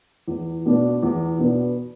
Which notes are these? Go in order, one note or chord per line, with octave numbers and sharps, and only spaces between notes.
E2
B2 B3 D4
E2
B2 B3 D4